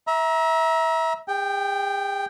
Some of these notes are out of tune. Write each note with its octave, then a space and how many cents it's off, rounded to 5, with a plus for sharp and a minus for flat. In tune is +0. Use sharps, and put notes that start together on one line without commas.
E5 -20 A#5 +30
G#4 -45 G5 +0